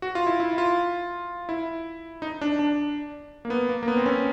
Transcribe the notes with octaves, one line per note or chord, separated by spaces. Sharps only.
F#4
F4
E4
E4
F4
E4
D#4
D4
D4
A#3
B3
A#3
A#3
B3
C4
C#4